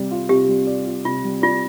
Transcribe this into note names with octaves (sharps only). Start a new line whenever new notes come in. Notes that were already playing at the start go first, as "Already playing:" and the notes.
Already playing: C3 G3 D5
F4
C3 G4
G3
D5
F4
C3 F4
G3
F4 D5